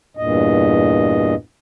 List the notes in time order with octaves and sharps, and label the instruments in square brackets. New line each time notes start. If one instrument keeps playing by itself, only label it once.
[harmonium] E2 G2 A#2 D#5